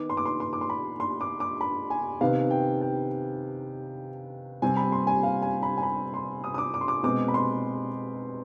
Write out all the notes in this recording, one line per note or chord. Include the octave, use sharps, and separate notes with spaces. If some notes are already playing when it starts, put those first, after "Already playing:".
Already playing: D#3 B3 D6
C6
D6
C6
C6
D6
C6
B5
C6
D6
D6
B5
G#5
C3 D#3 B3 F5
G5
G5
C3 G3 C4 G#5
B5
C6
G#5
F5
G#5
B5
G#5
B5
C6
D#6
D#6
D6
D6
C6
D6
B2 G#3 C4 D6
B5
C6